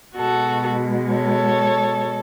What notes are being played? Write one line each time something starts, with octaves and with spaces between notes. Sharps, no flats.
B2 G#3 F#4 A4
A4 C#5